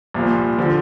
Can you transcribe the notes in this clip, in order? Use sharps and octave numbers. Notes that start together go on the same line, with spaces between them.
C2 A#2 F3
D3 F3